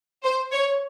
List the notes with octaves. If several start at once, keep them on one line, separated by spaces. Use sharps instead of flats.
C5
C#5